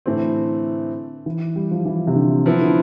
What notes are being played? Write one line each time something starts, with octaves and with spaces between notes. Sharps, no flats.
A2 D3 E3 A3 C4
E3
G3
F3
E3
C3
D3
F3 B3 E4
D3